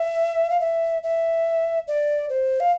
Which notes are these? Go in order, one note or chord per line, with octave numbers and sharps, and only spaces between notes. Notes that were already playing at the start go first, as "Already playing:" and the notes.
Already playing: E5
F5
E5
E5
D5
C5
F5